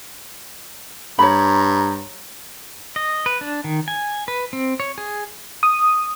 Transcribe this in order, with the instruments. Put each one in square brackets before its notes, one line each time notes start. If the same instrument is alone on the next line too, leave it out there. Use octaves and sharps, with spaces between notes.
[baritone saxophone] G2 [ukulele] C#5 B5 [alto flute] A#5
[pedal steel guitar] D#5
B4
D4
D#3
G#5
B4
C4
C#5
G#4
[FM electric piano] D#6